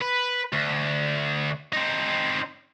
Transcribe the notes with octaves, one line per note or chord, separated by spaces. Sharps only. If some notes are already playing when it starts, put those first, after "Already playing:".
B4
D2
C4 D#4